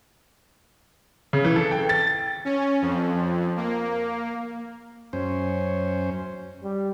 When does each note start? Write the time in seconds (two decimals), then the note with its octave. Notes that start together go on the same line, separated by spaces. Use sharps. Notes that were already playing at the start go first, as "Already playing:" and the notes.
1.33 C#3
1.45 E3
1.56 A4
1.71 G5
1.89 A6
2.45 C#4
2.82 F2
3.57 A#3
5.13 F#2 C#4 C5
6.63 G3